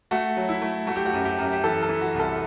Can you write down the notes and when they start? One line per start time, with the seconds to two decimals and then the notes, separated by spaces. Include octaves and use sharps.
0.11 A3 F#4
0.37 F#3
0.49 E4
0.62 A3
0.87 A3 F#4
0.96 G4
1.06 F#4
1.13 F#2
1.25 G4
1.38 F#2
1.53 G4
1.64 E3 A4
1.83 A4
1.89 E3
2.01 F#4
2.14 C2
2.20 A4